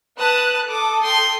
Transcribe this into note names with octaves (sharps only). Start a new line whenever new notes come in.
B4 A5 D#6 F#6
A4 D6 D#6
G5 C6